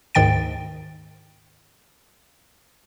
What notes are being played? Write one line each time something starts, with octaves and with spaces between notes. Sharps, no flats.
D2 G#2 D#3 G5 A6 D7